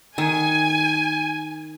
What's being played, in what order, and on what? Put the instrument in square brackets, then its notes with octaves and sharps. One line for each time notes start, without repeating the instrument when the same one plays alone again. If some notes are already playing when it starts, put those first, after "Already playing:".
[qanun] D#3 [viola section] G#5